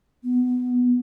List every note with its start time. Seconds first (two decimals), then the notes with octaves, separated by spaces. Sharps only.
0.23 B3